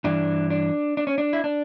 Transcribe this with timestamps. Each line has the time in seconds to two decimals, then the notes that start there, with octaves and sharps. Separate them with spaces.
0.04 G2 E3 D4
0.50 D4
0.97 D4
1.07 C#4
1.18 D4
1.33 E4
1.44 D4